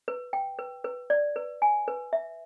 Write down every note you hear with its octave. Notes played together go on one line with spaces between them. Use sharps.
B4
G5
B4
B4
D5
B4
G#5
B4
E5